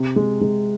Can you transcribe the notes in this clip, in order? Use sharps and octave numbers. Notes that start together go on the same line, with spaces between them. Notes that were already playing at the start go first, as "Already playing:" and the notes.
Already playing: C3
G#3
G#3